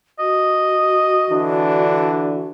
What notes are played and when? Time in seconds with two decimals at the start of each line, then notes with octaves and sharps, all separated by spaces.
0.19 F#4 D#5
1.30 D3 E3 D4